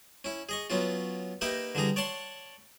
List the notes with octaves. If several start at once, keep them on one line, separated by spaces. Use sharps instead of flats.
C#4 E4
G#4 D#5 C#6
F#3 B3 C#4 F4
A#3 D#4 G4 B4 E5
D3 E3 G3 G#4 A#5
C#5 D5 F#5 A5 C6 C#6